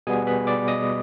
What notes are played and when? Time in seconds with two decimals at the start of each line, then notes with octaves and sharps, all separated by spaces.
0.07 B2 G3 B3 G#4 G#5
0.27 B4 B5
0.47 D5 D6
0.68 D#5 D#6